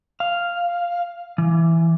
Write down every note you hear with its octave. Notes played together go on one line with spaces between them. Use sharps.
F5
E3